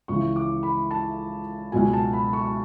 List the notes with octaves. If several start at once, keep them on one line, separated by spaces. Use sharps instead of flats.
C#2 C#3 E3 C#6
D6
B5
A5
C#2 B2 F#3 G#5
A5
B5
C#6